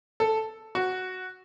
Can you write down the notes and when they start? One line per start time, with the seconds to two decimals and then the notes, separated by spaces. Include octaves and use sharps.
0.20 A4
0.75 F#4